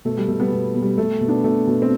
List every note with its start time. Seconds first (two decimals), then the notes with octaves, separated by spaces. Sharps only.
0.05 B2 A3
0.17 G3
0.28 B2 A3
0.40 G3 B3
0.52 B2 G3
0.75 B2
0.82 G3
0.98 B2 A3
1.21 B2
1.28 B3 D4
1.44 B2 A3
1.67 B2
1.82 C4